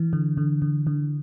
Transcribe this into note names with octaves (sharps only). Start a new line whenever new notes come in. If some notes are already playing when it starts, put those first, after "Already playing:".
Already playing: E3
D3
D3
D3
D3